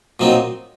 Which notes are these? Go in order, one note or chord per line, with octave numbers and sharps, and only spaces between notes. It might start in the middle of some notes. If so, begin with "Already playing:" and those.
A#2 F#3 C4 D#4